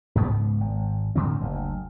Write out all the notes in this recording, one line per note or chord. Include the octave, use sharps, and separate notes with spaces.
C#2 G#2 B3
G#1
E2 A2 D3 C4
F#1 D2